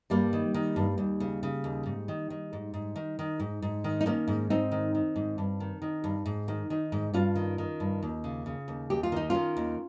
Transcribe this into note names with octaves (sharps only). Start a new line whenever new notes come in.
G2 G3 A#3
D#3
D#3
G2
D#2
C#3
C#3
D#2
G#2
D#3
D#3
G#2
G#2
D#3
D#3
G#2
G#2
D#3
D#4
D#3 A#3 C#4
G#2
G#2 C4 D#4
D#3
D#3
G#2
G2
D#3
D#3
G2
G#2
D#3
D#3
G#2
G2 C#4 F4
D#3
D#3
G2
D#2
C#3
C#3
D#2
D#2 G4
F4
D#3 D#4
D#3 C#4 F4
D#2